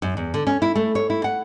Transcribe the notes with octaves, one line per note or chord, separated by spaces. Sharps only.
F#2
E2
D3
C#4
E4
A3
C#5
E4
F#5